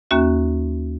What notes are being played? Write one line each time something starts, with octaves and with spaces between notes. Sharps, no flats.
D#2 A#3 C#4 F#4 E5